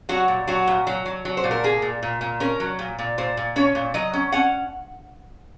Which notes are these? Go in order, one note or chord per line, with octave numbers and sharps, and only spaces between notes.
F#3 F#4
A#2
F#3 F#4
A#2
F#3
F#3
F#3
C5
A#2
A#4
A#3 G#4
A#2
A#2
A#2
C#4 A#4
F#3
A#2
A#2
A#2 C5
A#2
C#4 C#5
A#2
F#3 D#5
C#4
C#4 F#5